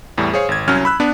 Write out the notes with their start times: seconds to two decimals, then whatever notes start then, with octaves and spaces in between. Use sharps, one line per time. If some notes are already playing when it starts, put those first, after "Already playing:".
0.18 E2 A2 G3
0.34 G#4 C5 C#5 F5
0.49 G#1 G#6
0.68 C2 F#3 C#4 F6
0.85 B5 E6 F#6
1.00 B3 D4 B4